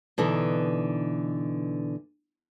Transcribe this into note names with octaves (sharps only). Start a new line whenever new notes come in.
B2 D3 E3 D#4